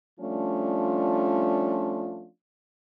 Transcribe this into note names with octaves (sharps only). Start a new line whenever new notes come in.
F3 G3 A3 C#4 D4 F4